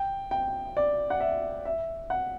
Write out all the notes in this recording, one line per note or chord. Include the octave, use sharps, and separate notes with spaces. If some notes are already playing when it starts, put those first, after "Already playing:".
Already playing: G5
G5
D5
F#5
E5
E5
F#5